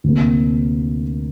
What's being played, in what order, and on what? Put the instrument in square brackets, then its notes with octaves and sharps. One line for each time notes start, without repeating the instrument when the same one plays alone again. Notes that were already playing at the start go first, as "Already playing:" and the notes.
[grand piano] D2 C3 A#3